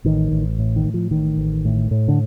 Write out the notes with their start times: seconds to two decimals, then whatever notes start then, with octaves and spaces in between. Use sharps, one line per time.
0.05 A1 D#3
0.31 A1
0.59 A2
0.76 D#3
0.84 A2
0.94 F3
1.11 A1 D#3
1.37 A1
1.65 A2
1.91 A2
2.08 D3